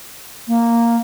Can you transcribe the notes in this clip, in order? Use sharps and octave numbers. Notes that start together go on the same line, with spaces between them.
A#3